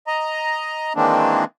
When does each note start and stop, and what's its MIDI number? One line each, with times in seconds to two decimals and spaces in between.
0.07 0.93 75
0.07 0.93 82
0.96 1.44 51
0.96 1.44 52
0.96 1.44 56
0.96 1.44 58
0.96 1.44 60
0.96 1.44 62